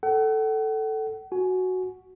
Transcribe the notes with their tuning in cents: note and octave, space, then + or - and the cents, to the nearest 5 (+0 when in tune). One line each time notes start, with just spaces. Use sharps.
A4 +0 F#5 +40
F#4 +0 G#5 +20